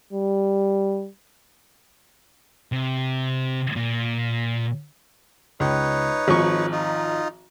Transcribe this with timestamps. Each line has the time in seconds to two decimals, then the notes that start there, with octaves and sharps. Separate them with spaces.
0.13 G3
2.72 C3
3.76 A#2
5.60 C#2 D#4 B4 C#5
6.28 G#1 F3 C#6
6.72 D#4 F4